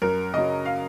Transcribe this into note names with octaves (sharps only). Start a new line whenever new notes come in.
F#2 A#4
C#3 F#3 D#5
F5